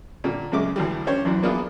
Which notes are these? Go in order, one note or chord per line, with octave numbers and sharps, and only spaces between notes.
A#2 D3 G3
F#2 C#3 G#3 E5 D6
D2 A2 E3 F#3 G3
C#4 D4 G4 C5 C#5
B1 F#2 E3 D4
A#3 B3 D4 E4 F4 G#4